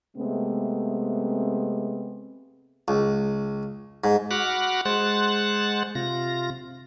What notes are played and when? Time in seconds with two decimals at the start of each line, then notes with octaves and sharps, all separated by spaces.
0.18 C3 G#3 A3 B3 C4
2.88 C#2
4.04 G#2
4.31 F#4 F#5 B5 D6 F6 F#6
4.85 G#3 C5 F#5 F#6 A6
5.95 C3 F4 A#6